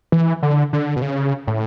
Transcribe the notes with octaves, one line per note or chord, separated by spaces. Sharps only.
E3
D3
D3
B2
C#3
A2